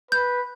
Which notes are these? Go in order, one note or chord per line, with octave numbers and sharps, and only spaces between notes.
B4 G6